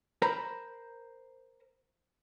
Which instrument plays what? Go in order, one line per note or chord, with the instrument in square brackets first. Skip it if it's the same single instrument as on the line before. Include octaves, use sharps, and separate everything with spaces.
[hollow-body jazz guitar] A#4 C5 A#5 B5